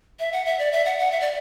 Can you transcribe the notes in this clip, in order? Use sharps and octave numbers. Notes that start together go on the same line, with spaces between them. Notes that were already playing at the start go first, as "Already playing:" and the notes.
E5
F#5
E5
D5
E5
F#5
F#5
E5
D5